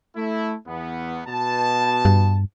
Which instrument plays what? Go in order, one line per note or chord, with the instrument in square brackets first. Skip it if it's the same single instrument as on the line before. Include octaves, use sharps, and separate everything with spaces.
[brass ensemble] A3 E4
E2 B3
B2 A5
[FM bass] G2